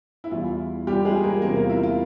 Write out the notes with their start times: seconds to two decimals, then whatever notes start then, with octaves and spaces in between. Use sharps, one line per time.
0.24 E4
0.31 E2 E3 G3 F4
0.87 G3 G4
1.05 G#3 G#4
1.24 A#3 A#4
1.42 E2 C3 G3 A#3 A#4
1.56 F4
1.69 E4
1.83 F4